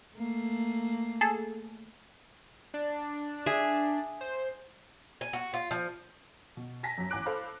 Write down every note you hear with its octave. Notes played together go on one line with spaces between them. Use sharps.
A3 A#3
G#4 A4
D4
G#4 E5
C5
G#5
F#4
F4
F3
B2
G#5 A5 A#6 B6
F#2 F#3
A1 G#5 D6 F#6 D7
A4 C5 F5 B5